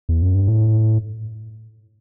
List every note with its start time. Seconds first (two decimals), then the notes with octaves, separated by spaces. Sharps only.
0.09 E2
0.22 F#2
0.35 G2
0.47 A2